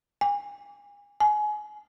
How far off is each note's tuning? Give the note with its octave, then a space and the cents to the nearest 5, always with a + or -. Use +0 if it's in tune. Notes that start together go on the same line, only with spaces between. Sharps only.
G#5 -35
G#5 +25